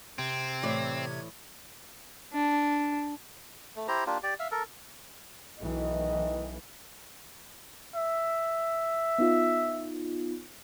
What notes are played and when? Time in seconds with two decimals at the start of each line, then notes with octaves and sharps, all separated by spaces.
0.18 C3 C4 G#6
0.63 A2 E3 D5
2.33 D4
3.76 A3
3.88 E4 G4 C5 A#5
4.07 A#3 D4 F4 G4
4.23 G4 D5
4.40 E5 F5
4.51 A4 A#4
5.59 B1 A2 D#3 E3 D#5
7.95 E5
9.18 B3 D#4 F4